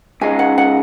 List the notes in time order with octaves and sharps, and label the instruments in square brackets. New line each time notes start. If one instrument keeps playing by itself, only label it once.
[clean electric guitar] C#2 C#3 G#3 D#4 [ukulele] G#5
[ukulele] F#5
F#5